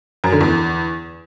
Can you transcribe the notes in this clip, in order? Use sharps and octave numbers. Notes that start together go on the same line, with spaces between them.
F#2
D3
E2